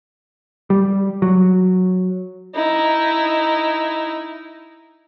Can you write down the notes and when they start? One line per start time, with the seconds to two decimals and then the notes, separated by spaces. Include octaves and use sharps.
0.70 G3
1.22 F#3
2.55 D#4 E4